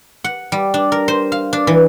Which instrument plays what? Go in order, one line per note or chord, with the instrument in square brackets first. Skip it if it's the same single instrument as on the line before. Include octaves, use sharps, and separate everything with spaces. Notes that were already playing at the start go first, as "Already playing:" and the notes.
[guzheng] F#5
G3
D4
A#4
C5
F5
D4
E3